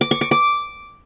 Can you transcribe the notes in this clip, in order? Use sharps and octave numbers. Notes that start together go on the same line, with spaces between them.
D6
C#6
D6
D6